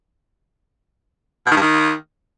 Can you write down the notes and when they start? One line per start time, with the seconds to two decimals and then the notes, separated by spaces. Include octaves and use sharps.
1.46 B2
1.51 D#3
1.56 G2
1.61 D#3